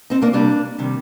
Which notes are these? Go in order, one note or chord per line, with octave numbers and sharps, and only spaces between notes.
C4 D#4
A#3 D4
C3 G3 A#3 D4
C3 D#3 G3